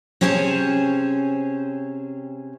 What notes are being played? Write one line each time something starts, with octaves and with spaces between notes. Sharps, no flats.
C3 C#4 G#4 C5 C#5 A5